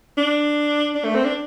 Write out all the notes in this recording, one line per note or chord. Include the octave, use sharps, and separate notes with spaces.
D4
D4
A3
C4
D4